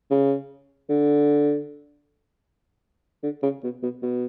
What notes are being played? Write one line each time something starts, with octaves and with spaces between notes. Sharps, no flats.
C#3
D3
D3
C#3
B2
B2
B2